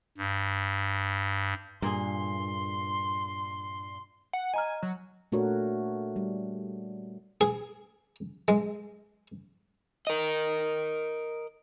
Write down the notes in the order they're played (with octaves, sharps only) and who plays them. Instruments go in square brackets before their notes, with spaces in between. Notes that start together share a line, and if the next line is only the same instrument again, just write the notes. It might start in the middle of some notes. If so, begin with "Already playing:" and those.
[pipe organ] G2
[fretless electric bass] G2 [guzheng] A#2 G#4 [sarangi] C6
[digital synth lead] F#5
[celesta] D#5 A#5 F6 [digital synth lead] G#5
[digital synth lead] F#3
[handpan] A#2 A3 D4 F#4 A#4 C#5
G3
[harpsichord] G#4
G#3
[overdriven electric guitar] A#4 D#5